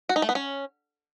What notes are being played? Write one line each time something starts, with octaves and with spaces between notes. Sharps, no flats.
F#4
D#4
A3
B3
C#4